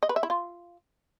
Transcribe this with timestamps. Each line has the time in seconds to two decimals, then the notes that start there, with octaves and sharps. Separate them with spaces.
0.03 D#5
0.09 B4
0.16 E5
0.23 E4
0.30 F4